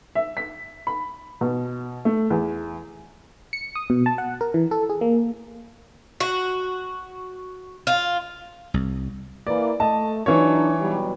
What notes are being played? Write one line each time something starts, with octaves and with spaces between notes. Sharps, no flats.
E5
B6
B5
B2
A3
E2
C#7
D#6
B2
A5
F#5
A#4
E3
A4
G#4
A#3
F#4
F4
C2
E3 A#3 D5
A3 D#5 A5
E3 F#3 D4 D#4 C#5
B2 F#3 G3